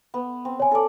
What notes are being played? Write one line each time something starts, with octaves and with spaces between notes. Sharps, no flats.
B3
C4
C#5 G#5
A4 D5